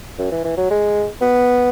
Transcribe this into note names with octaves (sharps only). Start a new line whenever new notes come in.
F#2
E3
E3
F#3
G#3
B3